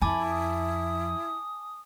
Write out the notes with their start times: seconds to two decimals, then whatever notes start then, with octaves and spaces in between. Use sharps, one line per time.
0.02 F2 E4 G#5 A5 B5 D6
0.30 D#6